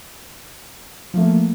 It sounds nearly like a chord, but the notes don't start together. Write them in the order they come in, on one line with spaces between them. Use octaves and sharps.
F3 A3 A#3